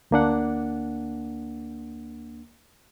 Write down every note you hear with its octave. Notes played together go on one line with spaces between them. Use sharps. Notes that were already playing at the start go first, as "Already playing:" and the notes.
D2 A#3 D4 F#5